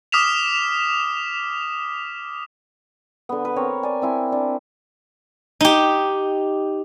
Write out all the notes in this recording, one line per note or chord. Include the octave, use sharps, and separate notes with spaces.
D6 D#6 F6 B6 E7 F7
D3 B3
B4
C4 A#4 C#5
D5 G#5
C4 E4 G#5
D4
D#4 G4